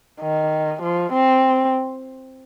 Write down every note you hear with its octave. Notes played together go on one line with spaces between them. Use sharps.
D#3
F3
C4